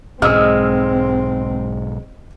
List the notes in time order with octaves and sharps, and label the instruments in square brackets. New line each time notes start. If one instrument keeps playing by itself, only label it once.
[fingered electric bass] B1 G#2 [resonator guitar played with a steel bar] G#3 [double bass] C4 [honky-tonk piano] E6 F6